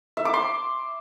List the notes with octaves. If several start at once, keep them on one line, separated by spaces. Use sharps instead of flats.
E5
D6
C6